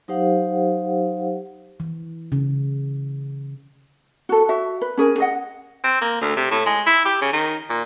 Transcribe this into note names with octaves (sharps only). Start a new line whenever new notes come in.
F#3 D#4 G4 C5 F5 F#5
E3
C#3
F#4 A4
F#4 E5
B4
C#4 G#4 A#4
G#4 D#5 F#5
C4
A#3
D2
C3
A2
G#3
E4
G4
C#3
D#3
A#2